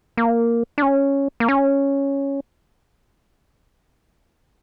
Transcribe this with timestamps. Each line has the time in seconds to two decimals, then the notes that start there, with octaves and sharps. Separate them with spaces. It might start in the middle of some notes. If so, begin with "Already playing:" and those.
0.17 A#3
0.78 D4
0.82 C#4
1.40 A#3
1.48 C#4